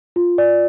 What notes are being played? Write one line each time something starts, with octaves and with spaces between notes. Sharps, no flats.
F4
D5